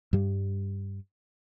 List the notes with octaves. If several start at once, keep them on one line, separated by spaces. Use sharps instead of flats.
G2 G3